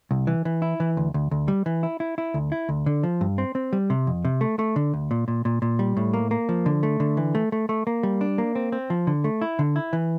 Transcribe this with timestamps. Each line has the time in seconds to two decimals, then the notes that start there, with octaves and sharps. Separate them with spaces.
0.11 C2
0.27 E3
0.45 E3
0.62 E4
0.80 E3
0.97 D2
1.14 D2
1.31 D2
1.48 G3
1.66 E3
1.83 E4
2.00 E4
2.18 E4
2.34 D2
2.52 E4
2.69 D2
2.86 D3
3.03 F3
3.21 G2
3.38 C4
3.55 C4
3.73 G3
3.90 C3
4.07 F2
4.25 C3
4.41 A3
4.59 A3
4.76 D3
4.93 D2
5.11 A#2
5.28 A#2
5.45 A#2
5.62 A#2
5.79 G3
5.97 A2
6.13 A#3
6.31 A#3
6.49 F3
6.66 D3
6.83 A3
7.00 D3
7.17 E3
7.35 A3
7.52 A3
7.69 A3
7.87 A#3
8.03 G3
8.21 D4
8.38 A#3
8.55 C4
8.72 C4
8.90 F3
9.07 D3
9.24 A3
9.42 E4
9.59 D3
9.76 E4
9.93 E3